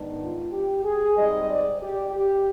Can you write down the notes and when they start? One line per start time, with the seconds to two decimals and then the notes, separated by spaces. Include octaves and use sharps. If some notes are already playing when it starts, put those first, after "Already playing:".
Already playing: G#2 D#3 B3 D4
0.20 F4
0.52 G4
0.84 G#4
1.16 G#2 G3 C4 D#5
1.48 D5
1.81 G4
2.13 G4